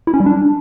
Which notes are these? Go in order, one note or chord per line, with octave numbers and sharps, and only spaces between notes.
E4
C#4
G3
D4